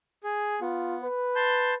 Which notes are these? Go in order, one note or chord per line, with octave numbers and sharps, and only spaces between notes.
G#4
B3 F4
B4
A5 C6 G6